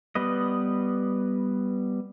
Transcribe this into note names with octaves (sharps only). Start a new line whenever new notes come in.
G3 B3 B4 D#5